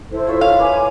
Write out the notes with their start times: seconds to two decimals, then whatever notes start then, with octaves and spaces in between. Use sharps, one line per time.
0.11 E4 A4 C5
0.27 F4 C#5 E5
0.41 F5
0.59 B4 G#5 D6